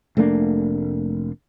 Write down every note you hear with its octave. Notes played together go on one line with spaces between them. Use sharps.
F1 A3 A#3 D4